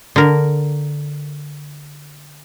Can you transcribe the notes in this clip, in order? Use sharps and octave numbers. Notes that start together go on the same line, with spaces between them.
D3 A#4